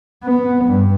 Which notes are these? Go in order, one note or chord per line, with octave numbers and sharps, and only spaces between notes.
B3
G2